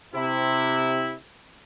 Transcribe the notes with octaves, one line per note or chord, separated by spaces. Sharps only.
C3 E4